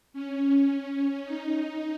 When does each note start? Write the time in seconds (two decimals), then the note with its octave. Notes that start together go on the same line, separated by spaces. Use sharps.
0.13 C#4
0.69 C#4
1.25 D#4